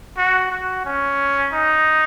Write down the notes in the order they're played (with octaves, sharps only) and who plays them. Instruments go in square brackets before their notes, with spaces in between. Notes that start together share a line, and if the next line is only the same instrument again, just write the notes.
[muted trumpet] F#4
F#4
C#4
D#4